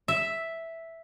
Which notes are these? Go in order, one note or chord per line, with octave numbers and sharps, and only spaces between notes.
E5